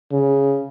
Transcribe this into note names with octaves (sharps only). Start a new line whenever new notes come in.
C#3